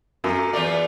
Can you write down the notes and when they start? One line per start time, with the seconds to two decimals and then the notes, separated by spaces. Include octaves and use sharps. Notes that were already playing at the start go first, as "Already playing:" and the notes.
0.24 F#2 A3
0.53 E2 A3 F4 D5